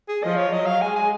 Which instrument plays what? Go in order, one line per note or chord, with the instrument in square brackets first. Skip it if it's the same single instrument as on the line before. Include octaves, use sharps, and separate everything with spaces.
[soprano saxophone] G#4
[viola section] F3 [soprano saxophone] D#5
[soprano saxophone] C#5
[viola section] F#3 [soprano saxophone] D#5
[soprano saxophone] F5
[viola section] G#3 [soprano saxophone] G#5
[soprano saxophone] G#5